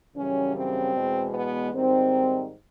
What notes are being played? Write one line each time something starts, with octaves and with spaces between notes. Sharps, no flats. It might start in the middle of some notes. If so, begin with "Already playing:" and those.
F#2 C#3 E3 G3 C#4
C4
E2 B2 G#3
B3
G#2 D#3 G3 C4